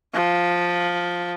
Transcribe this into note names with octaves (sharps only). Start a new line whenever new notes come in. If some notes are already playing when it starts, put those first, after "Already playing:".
F3